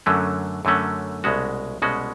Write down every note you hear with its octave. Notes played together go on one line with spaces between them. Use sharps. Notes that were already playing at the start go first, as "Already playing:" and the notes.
F#2 D3 F#3 A3 C#4
F#2 D3 F#3 A3 C#4
C2 B2 G#3 C#4 F#4
C2 B2 G#3 C#4 F#4